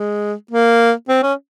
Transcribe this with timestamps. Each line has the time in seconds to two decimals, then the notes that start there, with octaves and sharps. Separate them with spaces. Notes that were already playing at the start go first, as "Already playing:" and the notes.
Already playing: G#3
0.51 A#3
1.09 C4
1.23 C#4